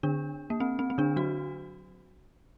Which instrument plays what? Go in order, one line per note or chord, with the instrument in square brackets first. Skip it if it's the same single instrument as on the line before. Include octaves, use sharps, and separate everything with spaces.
[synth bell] D3 D4
A#3
C4
C4
C4
D3 D4
F#3 F#4